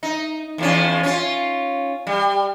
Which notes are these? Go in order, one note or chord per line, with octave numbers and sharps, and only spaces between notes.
D#4
E2 F3 C#4
C#4 F4
G3